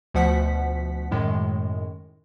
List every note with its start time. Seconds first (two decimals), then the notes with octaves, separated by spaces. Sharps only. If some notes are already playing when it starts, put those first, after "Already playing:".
0.14 D2 B2 F3 F#5 B6
1.11 F#2 A2 D#3 G#3